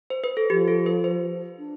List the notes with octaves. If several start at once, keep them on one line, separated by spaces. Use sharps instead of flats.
C5
B4
A4
F3 G4
A4
B4
C5
D4